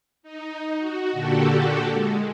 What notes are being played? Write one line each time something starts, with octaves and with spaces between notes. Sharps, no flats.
D#4
F#4
A#2 D3 F#4 G4 A4
G#3